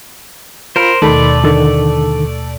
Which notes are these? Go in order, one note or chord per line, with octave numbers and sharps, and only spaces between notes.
F4 A#4 C5 B5
D#2 B2 D#3 A3 D5 B5 C6
D3 D#3 A4